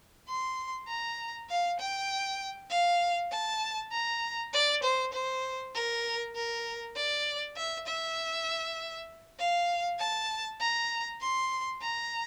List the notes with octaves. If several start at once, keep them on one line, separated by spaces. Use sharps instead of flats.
C6
A#5
F5
G5
F5
A5
A#5
D5
C5
C5
A#4
A#4
D5
E5
E5
F5
A5
A#5
C6
A#5